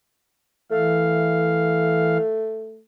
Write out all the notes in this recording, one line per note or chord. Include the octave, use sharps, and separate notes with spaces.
E3 A3 F5